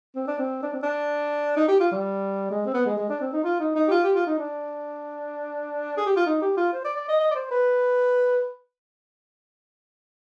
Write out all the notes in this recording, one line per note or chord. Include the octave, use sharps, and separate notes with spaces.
C4
D4
C4
D4
C4
D4
D#4
G4
F4
G3
G#3
C4
B3
G#3
G#3
D4
C4
D#4
F4
D#4
D#4
G4
F4
G4
F4
D#4
D4
G#4
G4
F4
D#4
G4
F4
C5
D5
D5
D#5
D#5
D5
C5
B4